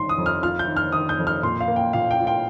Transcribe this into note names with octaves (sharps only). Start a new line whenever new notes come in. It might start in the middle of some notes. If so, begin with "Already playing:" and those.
Already playing: G1 D#3 C6
D#6
F2
F6
F4 F6
G6
D#3
F6
D#3 D#6
G6
F2
F6
A#2 C6
F5
A#3
G5
A#2 F5
G5
F4
G5